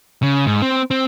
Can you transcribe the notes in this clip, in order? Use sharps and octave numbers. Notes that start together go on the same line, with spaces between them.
C#3
G#2
C4
C4